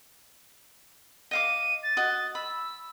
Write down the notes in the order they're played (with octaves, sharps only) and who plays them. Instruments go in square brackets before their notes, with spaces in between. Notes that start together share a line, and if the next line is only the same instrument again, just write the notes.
[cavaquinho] D#5 F5 D6 [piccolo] D#7
[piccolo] A6
[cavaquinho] F#4 D#5
[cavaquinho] B5 [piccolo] E6